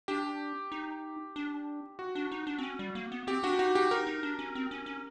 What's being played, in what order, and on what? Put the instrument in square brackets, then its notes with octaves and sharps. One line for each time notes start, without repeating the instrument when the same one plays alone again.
[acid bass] D4 [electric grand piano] G4
[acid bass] D#4
D4
[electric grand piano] F#4
[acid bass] D4
D#4
D4
C4
C#4
G3
A#3
B3
[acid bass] C4 [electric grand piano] G4
[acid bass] D4 [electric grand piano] F#4
[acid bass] D#4 [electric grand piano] F#4
[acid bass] D#4 [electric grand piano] G4
[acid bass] D#4 [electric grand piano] A#4
[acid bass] D#4
D4
C#4
C4
C#4
C#4